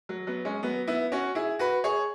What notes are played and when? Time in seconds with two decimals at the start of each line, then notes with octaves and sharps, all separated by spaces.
0.09 F#3
0.27 F#3 B3
0.45 G#3 C#4
0.63 F#3 B3
0.87 B3 E4
1.12 C#4 F#4
1.35 E4 G#4
1.59 F#4 B4
1.84 G#4 C#5